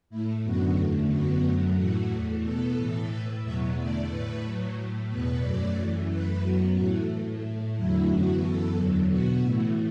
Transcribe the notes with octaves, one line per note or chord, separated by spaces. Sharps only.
A2 A3 E4
F#2 D3 B3 F#4
E2 D3 A3
F#2 D3 B3 F#4
F#2 F#3 A3
A2 E3 A3 F#4
E2 E3 A3
B2 B3 A4
A2 E3 A3 A4
A2 A3 B4
E2 B2 F#3 B3 E5
E2 D3 A3 D5
A2 A3 B4
A2 F#3 A3
A3
A2
E2 B2 B3 B4
F#2 F#3 A3 D5
F#2 E3 A3
F#2 E3 A3 B4
F#2 F#3 B3 F#4
A2 E3 A3 F#4
A2 A3
A2 A3
E2 D3 F#3 A3 E4
F#2 E3 B3 F#4
F#2 E3 B3 A4
E2 D3 F#3
B2 B3 F#4
A2 E3 A3